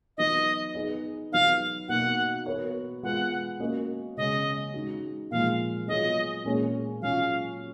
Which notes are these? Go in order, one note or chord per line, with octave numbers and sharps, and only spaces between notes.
F#3 B3 D#4 D#5
B3 D#4 G#4 B4 D#5
F#3 B3 D#4 F5
B2 A#3 D#4 F#4 A#4 F#5
B3 F#4 A#4 C#5
G#3 B3 F4 B4 F#5
A#3 C#4 F#4 A#4 D#5
C#3 G#3 C#4 D#5
G#3 D#4 F#4
A#2 F3 G#3 F5
F#3 B3 F4 G#4 C#5 D#5
A#2 G#3 C#4 G#4 C#5
F#3 C#4 F4 F5